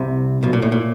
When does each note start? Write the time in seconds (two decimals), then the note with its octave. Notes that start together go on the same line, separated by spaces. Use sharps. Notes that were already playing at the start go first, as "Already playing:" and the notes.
Already playing: C2 C3
0.43 B1 B2
0.53 A#2
0.62 A2
0.72 A#2